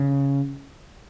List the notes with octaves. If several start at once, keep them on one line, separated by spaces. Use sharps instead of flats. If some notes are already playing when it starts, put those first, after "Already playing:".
Already playing: C#3